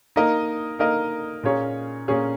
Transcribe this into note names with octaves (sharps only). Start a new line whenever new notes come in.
A#3 D#4 A#4 D#5
A#3 D#4 A#4 D#5
A#2 A#3 C#4 G#4 C#5
A#2 A#3 C#4 G#4 C#5